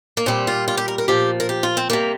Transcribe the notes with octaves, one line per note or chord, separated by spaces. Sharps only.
A#3
A#2 G3 C4
F4
F4
G4
A#4
A#4
A#2 F3 G4
A#4
G4
F4
C4
C3 G3 A#3